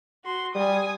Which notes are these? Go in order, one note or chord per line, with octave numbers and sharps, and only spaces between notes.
F#4 C6
G3 G#5 D#6